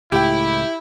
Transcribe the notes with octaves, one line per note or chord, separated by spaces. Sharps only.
C#2 A2 E4 G4 G5